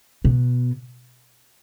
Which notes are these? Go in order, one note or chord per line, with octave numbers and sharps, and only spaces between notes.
B2